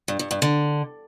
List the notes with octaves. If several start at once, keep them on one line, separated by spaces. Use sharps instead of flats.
G2
G2
G2
D3